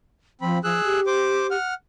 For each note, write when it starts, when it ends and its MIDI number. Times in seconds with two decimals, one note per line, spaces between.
0.41 0.62 53
0.41 0.58 60
0.41 0.58 83
0.64 0.81 53
0.64 1.00 68
0.64 1.00 88
0.64 1.00 90
0.84 1.56 67
1.06 1.47 72
1.06 1.47 86
1.51 1.74 78
1.51 1.74 89